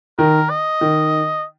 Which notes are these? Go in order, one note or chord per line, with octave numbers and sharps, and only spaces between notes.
D#3 A#4
D#5
D#3